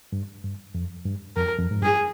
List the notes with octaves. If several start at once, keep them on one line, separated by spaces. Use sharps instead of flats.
G2
G2
F2
G2
F2 A#4
F2
G#2
G2 G#4